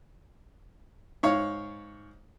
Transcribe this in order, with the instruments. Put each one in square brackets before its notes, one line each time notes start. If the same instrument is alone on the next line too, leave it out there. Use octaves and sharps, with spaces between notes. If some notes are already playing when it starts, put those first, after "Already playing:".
[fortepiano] G#2 C#5 F5